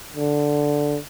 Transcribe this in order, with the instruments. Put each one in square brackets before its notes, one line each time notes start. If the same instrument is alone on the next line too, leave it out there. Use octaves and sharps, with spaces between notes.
[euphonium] D3